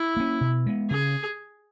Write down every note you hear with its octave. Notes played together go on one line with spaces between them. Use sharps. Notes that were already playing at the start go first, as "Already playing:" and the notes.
Already playing: E4
A#3 C#4
B2
G#3 B3
C#3 G#4